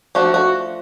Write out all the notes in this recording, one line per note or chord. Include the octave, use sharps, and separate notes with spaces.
F3 A3 D4 F#4
F#4